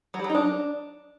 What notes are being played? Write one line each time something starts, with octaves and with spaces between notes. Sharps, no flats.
F#3
G3
F#3
D#4
D4